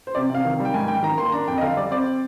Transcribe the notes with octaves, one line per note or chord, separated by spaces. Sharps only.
C5
C3 D5
C3 F5
D#3
G3
G5
G#2 G#5
G#2 G5
D#3 A#5
A#3 C6
D4 A#5
F2 G5
D#5
D3 F5
G3 D5
C4 D5